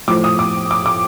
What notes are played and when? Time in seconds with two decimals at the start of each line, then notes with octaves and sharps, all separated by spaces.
0.08 A2 F3 D6
0.24 D#6
0.39 D6
0.71 D6
0.86 D6